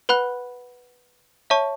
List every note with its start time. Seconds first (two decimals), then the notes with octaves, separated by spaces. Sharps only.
0.09 B4 F#5 B5 F#6
1.50 C#5 E5 A5 C#6